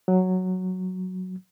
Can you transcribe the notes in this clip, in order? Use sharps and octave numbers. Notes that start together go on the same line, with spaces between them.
F#3